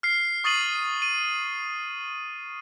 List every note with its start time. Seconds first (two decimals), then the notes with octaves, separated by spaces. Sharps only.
0.03 F6 C7
0.44 C#6 D#6 A6 C7 D#7 F#7
1.02 D#7